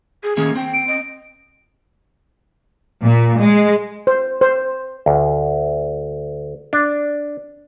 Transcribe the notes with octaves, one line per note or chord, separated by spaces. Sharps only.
G#4
D#3 A#3 C#4 G#4
C4 G5
D7
D#5
A#2
G#3
C5
C5
D2
D4